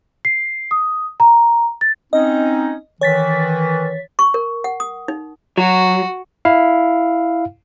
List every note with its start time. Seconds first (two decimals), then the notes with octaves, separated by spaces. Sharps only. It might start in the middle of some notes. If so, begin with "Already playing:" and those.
0.25 C7
0.71 D#6
1.20 A#5
1.81 A6
2.13 C4 C#4 D#4 D#5
3.01 D#3 E3 C#5 A6 B6
4.19 C#6
4.34 A#4
4.64 F#5
4.80 D#6
5.08 D#4
5.58 F#3 F#4
6.45 E4 F5